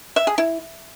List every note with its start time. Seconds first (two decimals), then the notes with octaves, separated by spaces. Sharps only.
0.16 E5
0.27 G#4
0.38 E4